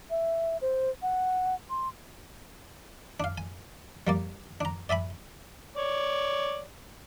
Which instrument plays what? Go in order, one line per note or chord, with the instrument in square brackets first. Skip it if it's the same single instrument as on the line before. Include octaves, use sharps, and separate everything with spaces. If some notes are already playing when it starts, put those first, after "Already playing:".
[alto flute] E5
C5
F#5
C6
[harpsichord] D4 F5
G#5
G3 A#3 D5
D4 A#5
D5 E5 G#5 B5
[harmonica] C#5 D5